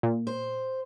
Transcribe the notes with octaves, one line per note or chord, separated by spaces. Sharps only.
A#2
C5